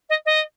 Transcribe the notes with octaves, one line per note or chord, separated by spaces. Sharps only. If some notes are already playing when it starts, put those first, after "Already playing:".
D#5
D#5